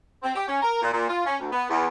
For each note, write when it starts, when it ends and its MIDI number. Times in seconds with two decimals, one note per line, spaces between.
0.23 0.32 60
0.35 0.48 67
0.48 0.61 61
0.62 0.79 70
0.82 0.89 46
0.93 1.08 46
1.09 1.22 65
1.25 1.36 61
1.40 1.50 38
1.52 1.66 59
1.70 1.87 40